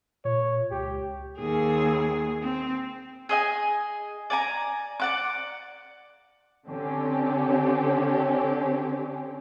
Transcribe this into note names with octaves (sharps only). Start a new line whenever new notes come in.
A#2 C#5
C#2 G4
D#2 G#4
C4
G#4 D#5 G#5
D5 G#5 A#5
D5 F#5 D6
D3 C4 C#4 G4